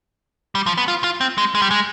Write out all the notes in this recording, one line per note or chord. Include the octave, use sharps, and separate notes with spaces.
G3
F3
B3
F4
F4
C4
G#3
G#3
G3
G#3